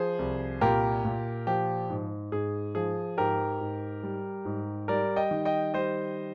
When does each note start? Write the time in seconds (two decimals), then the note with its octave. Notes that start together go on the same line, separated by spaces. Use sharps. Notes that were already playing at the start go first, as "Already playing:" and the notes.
Already playing: F3 G#4 C5
0.19 C2
0.61 A#2 G4 A#4
1.05 A#2
1.47 F3 G4
1.90 G#2
2.32 G#2 G#4
2.75 F3 G#4
3.18 G#2 G4 A#4
3.61 G#2
4.03 G3
4.45 G#2
4.88 G3 A#4 D5
5.16 D#5 G5
5.31 D#3
5.45 D#5 G5
5.74 G3 C5 D#5